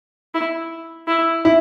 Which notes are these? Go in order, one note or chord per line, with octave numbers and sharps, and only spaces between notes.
E4
E4
E4